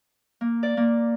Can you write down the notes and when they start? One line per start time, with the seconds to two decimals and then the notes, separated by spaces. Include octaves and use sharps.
0.41 A#3
0.63 D5
0.77 A#3